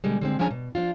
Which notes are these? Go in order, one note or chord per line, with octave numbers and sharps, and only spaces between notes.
B2 D3 G3 G#3
D3 G#3 C4
F3 C#4 D4 G#4 G#5 A#5
B2
F3 D4 F4